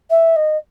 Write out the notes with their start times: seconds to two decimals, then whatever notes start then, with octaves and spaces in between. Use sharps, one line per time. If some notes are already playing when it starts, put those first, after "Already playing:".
0.10 E5
0.36 D#5